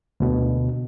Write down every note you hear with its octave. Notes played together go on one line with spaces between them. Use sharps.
D2 B2